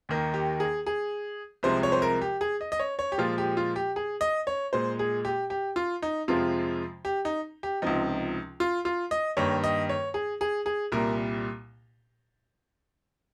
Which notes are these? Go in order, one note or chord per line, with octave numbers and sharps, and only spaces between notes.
D#2 D#3 A#3
G4
G#4
G#4
C2 C3 F3 G#3 C5
C#5
C5
A#4
G4
G#4
D#5
D#5
C#5
C#5
G4
A#2 F3 G#3 F4
G4
F4
G4
G#4
D#5
C#5
A#2 G#3 C5
G#4
G4
G4
F4
D#4
F2 C3 F3 G#3 F4
G4
D#4
G4
C#2 C3 F3 D#4
F4
F4
D#5
G2 D#3 A#3 C#5
D#5
C#5
G#4
G#4
G#4
C2 A#2 G3 A#4